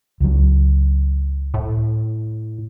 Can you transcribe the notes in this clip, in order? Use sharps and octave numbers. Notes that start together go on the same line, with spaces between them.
C#2 F#3
A2